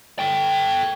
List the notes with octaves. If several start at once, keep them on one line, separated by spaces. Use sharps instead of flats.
A4 G5